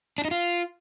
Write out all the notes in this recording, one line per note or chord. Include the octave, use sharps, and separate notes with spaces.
D4
D#4
F4